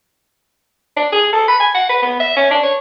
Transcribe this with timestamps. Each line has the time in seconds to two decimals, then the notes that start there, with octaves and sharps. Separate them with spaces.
0.96 D4
1.12 G#4
1.33 A4
1.48 B5
1.60 G#5
1.75 F#5
1.89 B4
2.02 B3
2.20 E5
2.36 C#4
2.51 D4
2.63 C#5